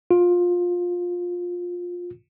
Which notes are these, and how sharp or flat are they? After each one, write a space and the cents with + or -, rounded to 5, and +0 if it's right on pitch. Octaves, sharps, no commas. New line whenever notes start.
F4 +20